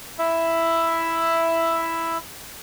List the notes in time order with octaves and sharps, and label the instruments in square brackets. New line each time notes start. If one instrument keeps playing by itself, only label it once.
[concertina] E4 E5